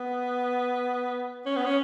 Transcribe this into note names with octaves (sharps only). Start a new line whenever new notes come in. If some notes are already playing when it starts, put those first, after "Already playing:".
Already playing: B3
C#4
B3
C#4